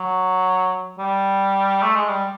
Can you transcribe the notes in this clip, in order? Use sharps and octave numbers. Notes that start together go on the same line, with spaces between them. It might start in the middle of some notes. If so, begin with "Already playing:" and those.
Already playing: F#3
G3
A3
G#3
G3